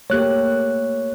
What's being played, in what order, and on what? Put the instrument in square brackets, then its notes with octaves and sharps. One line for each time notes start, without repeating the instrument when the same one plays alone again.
[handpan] A3 A#3 G4 [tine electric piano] C#5 F#6